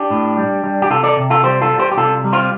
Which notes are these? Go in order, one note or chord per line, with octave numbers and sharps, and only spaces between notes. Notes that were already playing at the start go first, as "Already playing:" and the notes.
Already playing: D4 G4
A2
G3
G3
G4
C3 F4 A4
A4 D5
C3
F4 A4
G3 G4 C5
F4 A4
G3
G4 C5
G4
C3 F4 A4
G3
C4 F4